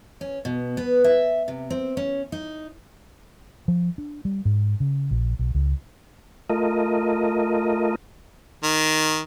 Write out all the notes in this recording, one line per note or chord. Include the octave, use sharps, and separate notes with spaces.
C#4
B2
B3
E5
C3
C4
C#4
D#4
F3
D4
G3
G#2
C#3
A#1
B1
C#2
A3 F4 A#4 D#5
D#3